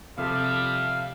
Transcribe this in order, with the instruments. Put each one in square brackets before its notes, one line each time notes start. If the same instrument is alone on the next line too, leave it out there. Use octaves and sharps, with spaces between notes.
[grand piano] C3 F3 A4 [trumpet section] G3 E5 [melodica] F5